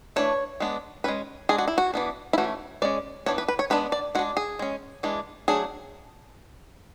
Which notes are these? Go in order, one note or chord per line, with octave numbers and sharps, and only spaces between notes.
E3 A3 D4 C#5
G#3 B3 D4
G#3 C#4 B4
G#3 D4 G#4
F#4
E4
F#4
E3 B3 D4
E4
E3 A3 C#4 F#4
G#3 C#4 D5
E3 B3 D4 C#5
B4
B4
C#5
G#3 B3 D4 B4
D5
G#3 D4 F#4
G#4
G#3 C#4
E3 G#3 D4
F#3 A3 D4 G#4